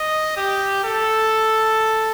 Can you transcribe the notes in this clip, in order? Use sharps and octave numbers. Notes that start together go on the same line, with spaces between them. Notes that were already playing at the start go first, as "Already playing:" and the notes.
Already playing: D#5
G4
A4